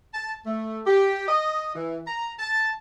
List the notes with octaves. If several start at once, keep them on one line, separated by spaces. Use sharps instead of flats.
A5
A3
G4
D#5
E3
A#5
A5